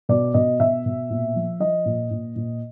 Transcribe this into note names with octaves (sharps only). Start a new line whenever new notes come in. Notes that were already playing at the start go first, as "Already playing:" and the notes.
B2 D5
B2 D#5
B2 E5
B2
A#2
F3
F3 D#5
A#2
A#2
A#2